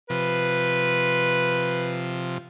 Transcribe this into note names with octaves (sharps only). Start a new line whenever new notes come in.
C3 F3 B4